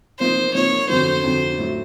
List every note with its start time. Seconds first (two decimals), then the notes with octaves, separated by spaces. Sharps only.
0.19 C3 F3 A#3 D#4 C5
0.55 C3 F3 A#3 D#4 C#5
0.89 F2 D3 F#3 C5
1.24 F2 D3 F#3
1.58 A2 F#3 A3